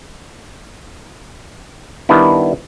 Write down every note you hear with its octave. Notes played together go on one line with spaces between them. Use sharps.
D#3 G3 B3 D4 E4